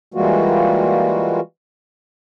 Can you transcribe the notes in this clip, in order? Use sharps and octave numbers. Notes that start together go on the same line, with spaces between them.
E3 G3 G#3 A#3 F4 F#4